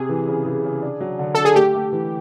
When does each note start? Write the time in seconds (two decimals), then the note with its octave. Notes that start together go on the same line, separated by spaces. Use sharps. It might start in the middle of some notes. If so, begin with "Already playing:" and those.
Already playing: C3 G#4
0.09 E3
0.27 C#3
0.45 E3
0.64 C#3
0.82 D4
1.01 F#3
1.19 D3
1.35 D4 A4
1.45 G#4
1.55 A3 G4
1.74 A3
1.92 E3